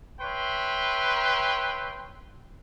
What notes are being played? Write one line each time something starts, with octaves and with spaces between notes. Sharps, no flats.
B4 C#5 E5 G5 C6